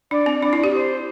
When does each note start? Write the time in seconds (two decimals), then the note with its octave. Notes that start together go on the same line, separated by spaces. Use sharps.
0.11 D4 D5
0.26 C4
0.42 D4 D5
0.53 E4
0.57 D5
0.64 G4
0.74 C5